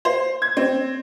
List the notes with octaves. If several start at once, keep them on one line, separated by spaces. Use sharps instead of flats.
C5
G#6
C4